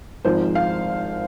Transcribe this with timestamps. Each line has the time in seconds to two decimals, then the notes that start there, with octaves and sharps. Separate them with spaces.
0.25 G#1 G#2 F3 C5
0.55 F5